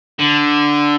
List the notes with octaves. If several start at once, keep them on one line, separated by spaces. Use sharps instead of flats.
D3